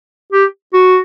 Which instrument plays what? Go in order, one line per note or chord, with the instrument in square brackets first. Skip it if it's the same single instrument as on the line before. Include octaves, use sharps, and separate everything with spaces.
[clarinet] G4
F#4